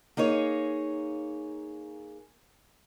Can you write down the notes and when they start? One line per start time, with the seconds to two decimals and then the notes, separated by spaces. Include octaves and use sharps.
0.17 A#3 D#4 G#4 C#5